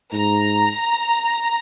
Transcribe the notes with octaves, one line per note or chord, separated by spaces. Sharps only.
G#2 A#5